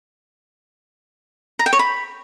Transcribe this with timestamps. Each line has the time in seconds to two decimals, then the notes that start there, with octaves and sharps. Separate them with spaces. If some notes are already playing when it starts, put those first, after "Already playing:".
1.59 A#5
1.66 G5
1.73 C#5
1.79 B5